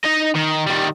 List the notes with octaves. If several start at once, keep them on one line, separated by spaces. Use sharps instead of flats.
D#4 D#5
D#3
D#3 G3